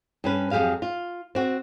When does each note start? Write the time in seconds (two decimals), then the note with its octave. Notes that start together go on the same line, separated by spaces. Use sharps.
0.24 G2 C#4 B4
0.51 F2 F#3 G4 G#4 F5
0.82 F4
1.35 C4 F#4